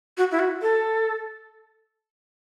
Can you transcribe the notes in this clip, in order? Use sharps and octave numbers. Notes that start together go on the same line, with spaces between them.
F#4
E4
F#4
A4